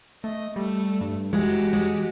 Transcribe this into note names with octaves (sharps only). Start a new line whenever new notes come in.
A3 D#5
G3 A3
G2
E3 G#3 F#4 G4
G#3